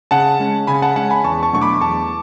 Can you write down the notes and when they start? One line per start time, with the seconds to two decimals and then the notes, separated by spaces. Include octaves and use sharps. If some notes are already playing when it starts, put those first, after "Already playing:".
0.11 C#3 F#5 A5
0.40 G#3 C#4
0.67 C#3 G#5 B5
0.82 F#5 A5
0.96 G#3 C#4 F#5 A5
1.10 G#5 B5
1.24 E2 A5 C#6
1.43 A5 C#6
1.53 B2 F#3 A3 D4 C#6
1.62 B5 D6
1.81 E2 A5 C#6